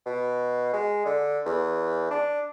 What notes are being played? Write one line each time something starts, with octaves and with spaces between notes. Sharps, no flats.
B2
G#3
D3
E2
D4